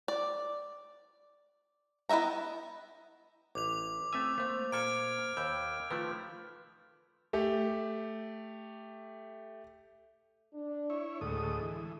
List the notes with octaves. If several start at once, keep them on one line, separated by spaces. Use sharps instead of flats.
D5
B3 E4 D#5 E5 A#5
A1 D6 F7
A3 C4 E5 G#5 E6
A3 A#3 C5
A#2 A4 F6 G#6 D7
D#2 B5 E6 G6
D#3 F3 A3 F4 B4
A3 G4
D4
E4 C#5
D2 A2 G#3 A4 D#6
E3